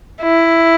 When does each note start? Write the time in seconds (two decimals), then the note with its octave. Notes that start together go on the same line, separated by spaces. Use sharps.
0.23 E4